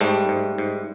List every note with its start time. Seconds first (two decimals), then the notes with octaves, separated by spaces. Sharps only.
0.01 G#2 G3 A3
0.29 G#2
0.58 G#2